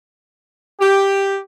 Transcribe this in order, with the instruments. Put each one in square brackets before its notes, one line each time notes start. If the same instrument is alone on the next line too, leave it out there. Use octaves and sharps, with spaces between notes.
[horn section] G4